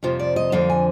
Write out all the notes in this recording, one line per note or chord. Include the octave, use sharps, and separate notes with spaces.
F2 C3 F3
D5
D#5
F2 D3 F3 F5
G#5